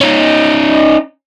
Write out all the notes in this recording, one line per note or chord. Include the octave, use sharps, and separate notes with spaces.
C#4 D#4